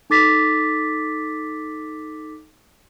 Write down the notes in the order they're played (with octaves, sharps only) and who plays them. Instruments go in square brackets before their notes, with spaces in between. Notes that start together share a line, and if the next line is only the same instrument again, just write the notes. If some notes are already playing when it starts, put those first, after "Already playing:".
[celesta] D#4 A4 D6 A6 B6